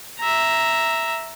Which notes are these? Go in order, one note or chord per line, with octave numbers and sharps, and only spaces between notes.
E5 A#5